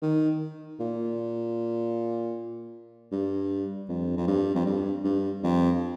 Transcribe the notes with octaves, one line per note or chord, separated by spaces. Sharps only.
D#3
A#2
G2
F2
F2
G2
F2
G2
G2
F2